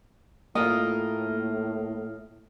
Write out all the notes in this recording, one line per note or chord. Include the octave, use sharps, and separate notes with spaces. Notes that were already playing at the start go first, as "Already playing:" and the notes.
A2 A#3 F4 A#4 D#5